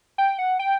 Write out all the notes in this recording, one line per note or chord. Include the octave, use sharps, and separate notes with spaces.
G5
F#5
G5